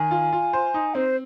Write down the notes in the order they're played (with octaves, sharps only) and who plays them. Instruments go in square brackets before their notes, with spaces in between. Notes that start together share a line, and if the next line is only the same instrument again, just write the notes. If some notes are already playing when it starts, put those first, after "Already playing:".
Already playing: [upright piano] D#3 [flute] G#5
[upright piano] F4
F4
C5
D#4
[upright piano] C4 [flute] C5